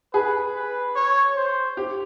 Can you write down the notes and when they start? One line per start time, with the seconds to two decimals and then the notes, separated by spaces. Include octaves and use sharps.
0.14 G#4 B4
0.55 B4
0.96 C#5
1.36 C5
1.77 G4